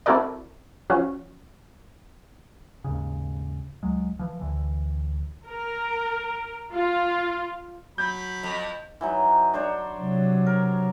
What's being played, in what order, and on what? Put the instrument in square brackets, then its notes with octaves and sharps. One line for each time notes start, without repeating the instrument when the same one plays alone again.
[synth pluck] C4 E4 F#4 A4 A#4 D5
F3 C#4 F#4
[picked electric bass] D#2 G#2 C#3
C#2 F#3 G#3
E3 F3
D2 D3 E3
[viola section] A#4
F4
[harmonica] F#3 B5 [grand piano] G6
[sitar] F2
[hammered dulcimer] E3 F#3 D#4
D4 C5 C#5
[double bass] C3 F#3
[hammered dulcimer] A#4